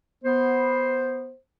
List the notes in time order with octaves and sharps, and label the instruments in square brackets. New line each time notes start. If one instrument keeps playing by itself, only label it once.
[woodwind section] B3 C5